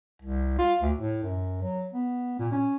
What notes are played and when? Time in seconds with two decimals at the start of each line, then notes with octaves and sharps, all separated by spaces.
0.22 C2
0.58 F4
0.82 D2
0.97 A2
1.23 F#2
1.62 F#3
1.93 B3
2.39 A#2
2.52 C#4